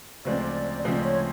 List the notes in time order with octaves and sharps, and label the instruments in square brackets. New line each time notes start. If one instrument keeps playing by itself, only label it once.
[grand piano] D2 C#3 F3 G#3 C4 [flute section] D5
[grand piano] D2 C#3 F3 G#3 C4 [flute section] D5
[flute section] C#5